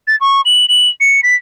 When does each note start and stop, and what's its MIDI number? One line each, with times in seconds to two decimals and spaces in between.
0.08 0.16 93
0.21 0.41 85
0.45 0.66 102
0.69 0.89 102
1.01 1.21 97
1.23 1.35 95